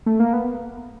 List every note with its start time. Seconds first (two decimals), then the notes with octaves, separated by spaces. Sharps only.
0.06 A3
0.20 A#3
0.33 B3